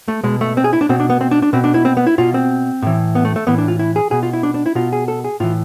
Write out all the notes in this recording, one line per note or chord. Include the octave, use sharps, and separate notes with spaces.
A3
B2 G#3
A3
C4
G#4
E4
D4
B2 C4
D4
B3
C4
D4
D4
B2 C4
D4
E4
C4
B3
E4
B2 F4
C4
A2 E3
B3
A3
A3
A2 E3 B3
D4
F4
E4
G#4
B2 G#4
F4
E4
D4
D4
E4
B2 F4
G#4
A4
G#4
A2 E3 F4